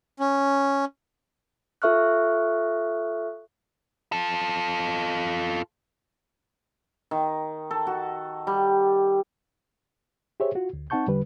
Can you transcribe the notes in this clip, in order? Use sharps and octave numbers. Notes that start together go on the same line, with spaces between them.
C#4
F4 A4 E5 C#6 F6 F#6
F4 A4
D#3
A4
F#4
G3
G4 G#4 C5 C#5 E5
F4 F#4
D2
C4 D#4 F#5 A5 C#6 G6
E2 D3 G3 B4